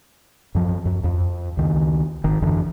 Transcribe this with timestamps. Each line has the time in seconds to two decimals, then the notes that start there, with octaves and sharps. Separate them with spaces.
0.55 F#2 F3
0.85 F#2
1.04 F2
1.57 C#2 D#3
2.24 G#1 D#3
2.42 F#2 D3 E3